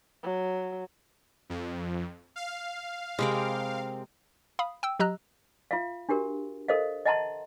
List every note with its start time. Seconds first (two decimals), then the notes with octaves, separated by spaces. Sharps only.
0.23 F#3
1.49 F2
2.36 F5
3.19 C3 G#3 C4 A#4 B5 D6
4.59 F5 B5 D#6
4.83 G5 E6
4.99 F#3 G4 D#5 A#5 E6 F#6
5.71 F4 E5 F5
6.09 D4 F#4 G4 A#4
6.68 A4 A#4 C5 D#5 F5
7.05 D#5 E5 F#5 A5 A#5 C6